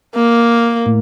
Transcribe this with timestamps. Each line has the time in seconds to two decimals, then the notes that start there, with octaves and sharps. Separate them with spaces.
0.15 A#3
0.86 A2